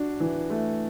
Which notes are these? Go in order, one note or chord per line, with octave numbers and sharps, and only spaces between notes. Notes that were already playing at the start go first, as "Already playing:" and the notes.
Already playing: D4 F#4
E3
A3